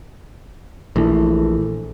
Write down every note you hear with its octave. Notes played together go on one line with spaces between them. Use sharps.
A#1 E3 A3